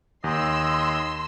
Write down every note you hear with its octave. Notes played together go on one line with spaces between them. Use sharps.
D#2 D#5 C6 E6